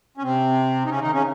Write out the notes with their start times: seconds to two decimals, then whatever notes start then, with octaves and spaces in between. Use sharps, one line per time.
0.17 C#4
0.23 C3 C4
0.85 D#4
0.90 C#3 C#4
1.01 D#3 D#4
1.12 C#3 C#4